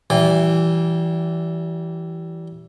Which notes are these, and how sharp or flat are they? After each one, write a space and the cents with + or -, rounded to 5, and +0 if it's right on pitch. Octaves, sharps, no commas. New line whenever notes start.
E3 +10 G3 -25 G#5 -35